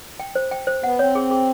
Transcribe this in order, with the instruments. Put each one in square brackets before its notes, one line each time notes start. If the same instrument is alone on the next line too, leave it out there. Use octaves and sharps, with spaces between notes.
[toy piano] G5
C5
G5
C5
[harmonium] B3 [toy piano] F#5
[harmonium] C4 [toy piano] C#5
[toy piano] G#4
G#4